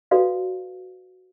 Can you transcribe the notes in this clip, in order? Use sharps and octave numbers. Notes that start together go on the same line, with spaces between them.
F#4 A4 B4 D5 F5